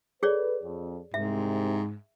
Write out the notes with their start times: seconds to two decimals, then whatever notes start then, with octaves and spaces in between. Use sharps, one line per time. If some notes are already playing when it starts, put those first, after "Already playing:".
0.23 G#4 A4 B4 C#5 D5
0.63 F2
1.14 C2 G#2 C3 E5